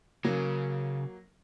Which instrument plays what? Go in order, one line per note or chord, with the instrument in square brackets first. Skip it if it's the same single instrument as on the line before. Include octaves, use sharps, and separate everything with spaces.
[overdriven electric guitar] C#3 [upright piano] F#3 A#3